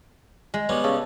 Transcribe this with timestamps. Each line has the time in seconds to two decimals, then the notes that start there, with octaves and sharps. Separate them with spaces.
0.54 G#3
0.69 G3 B3 C#4
0.84 C#3 A4